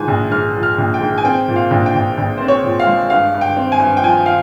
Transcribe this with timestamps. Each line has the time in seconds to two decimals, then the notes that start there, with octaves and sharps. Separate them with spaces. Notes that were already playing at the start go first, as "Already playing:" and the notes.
Already playing: G#2 F3 G#5
0.08 A#1
0.31 G#2 F6
0.55 F3
0.63 F6
0.78 A#1
0.94 G5
1.01 G#2
1.18 G#5
1.25 C4 G5
1.48 A#2
1.56 F5
1.71 A#1
1.86 G5
1.95 A#1
2.18 A#1
2.38 C4 C5
2.48 C#5
2.64 A#2
2.80 F5
2.87 G#3
3.10 G2 F5
3.34 G2
3.41 G5
3.57 C4
3.72 G#5
3.80 G2
3.97 G5
4.03 F3 G#5
4.26 F5